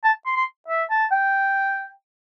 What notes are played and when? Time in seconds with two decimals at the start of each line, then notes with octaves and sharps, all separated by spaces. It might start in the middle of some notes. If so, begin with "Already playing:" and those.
0.04 A5
0.26 C6
0.36 C6
0.68 E5
0.90 A5
1.12 G5